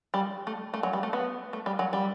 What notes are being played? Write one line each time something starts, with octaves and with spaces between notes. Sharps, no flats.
G3
A3
A3
F#3
G3
A3
B3
A3
G3
F#3
G3